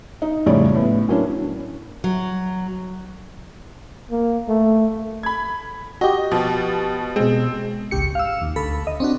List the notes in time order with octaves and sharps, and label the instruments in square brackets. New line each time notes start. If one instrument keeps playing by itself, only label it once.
[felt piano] D#4
F2 A2 C#3 G3 C#5 D5
A2 B3
F#3 A#3 C#4 D4 E4
[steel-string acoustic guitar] F#3
[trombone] A#3
A3
[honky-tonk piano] B5 G#6
[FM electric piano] F#4 G4 [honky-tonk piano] D#5
[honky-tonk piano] B2 F3
[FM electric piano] B2 G#3 [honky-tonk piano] C4
[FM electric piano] G#1 C#2 G4 C#7
F5 E6
D#2
D2 A4 B5
D#5
C4 D4 F#4